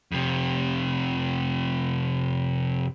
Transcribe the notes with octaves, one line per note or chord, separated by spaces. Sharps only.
F2 C3